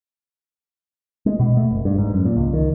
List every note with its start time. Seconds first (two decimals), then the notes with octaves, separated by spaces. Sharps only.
1.26 G#3
1.40 B2
1.57 A3
1.71 F#1
1.85 G2
1.98 G#2
2.14 F#2
2.25 A#2
2.37 C#2
2.53 D#3